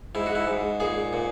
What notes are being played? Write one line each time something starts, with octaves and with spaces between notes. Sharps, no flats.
G#2 E4
F#4
E4
G#2
A#2 G#4
A#2